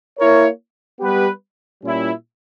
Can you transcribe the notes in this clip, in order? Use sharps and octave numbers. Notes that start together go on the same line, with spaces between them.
A#3 E4 A#4 C#5
G3 B3 G4 B4
A#2 G3 C#4 E4